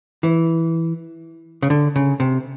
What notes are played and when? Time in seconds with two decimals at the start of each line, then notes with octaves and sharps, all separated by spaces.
0.23 E3
1.62 C#3
1.70 D3
1.96 C#3
2.20 C3